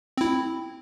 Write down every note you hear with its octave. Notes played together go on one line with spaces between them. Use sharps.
C4 E4